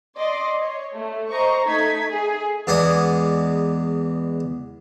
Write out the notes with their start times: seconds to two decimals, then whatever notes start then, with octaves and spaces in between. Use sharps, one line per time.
0.17 D5 D#5 C6
0.60 C#5
0.93 A3
1.30 C5 D#5 A#5 C#6
1.65 A3 D#4 G#6 B6
2.10 G#4
2.67 E2 G#3 B3 D5 G#5 D#6